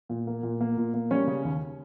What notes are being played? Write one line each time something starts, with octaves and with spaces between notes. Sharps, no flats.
A#2
A#3
A#2
A#3
A#2
A#3
G3 C#4 C#5
C#3
D#2